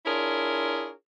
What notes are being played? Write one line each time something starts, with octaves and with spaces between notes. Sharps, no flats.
D4 E4 F4 G#4 A#4 C#5